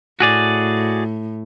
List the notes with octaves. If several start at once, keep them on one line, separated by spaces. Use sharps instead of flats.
A2 F#4 G#4 D5